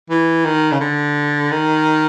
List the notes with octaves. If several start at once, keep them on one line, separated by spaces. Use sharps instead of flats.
E3
D#3
C#3
D3
D#3